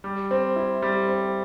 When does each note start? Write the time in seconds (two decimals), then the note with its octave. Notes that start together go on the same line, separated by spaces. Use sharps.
0.04 G3
0.31 C4
0.56 E4
0.82 G3
1.08 C4